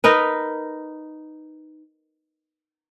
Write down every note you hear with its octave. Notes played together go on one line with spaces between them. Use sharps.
D#4 A#4 B4